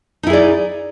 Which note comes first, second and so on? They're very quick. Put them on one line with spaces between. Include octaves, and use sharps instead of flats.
D#4 E4 G#4 D5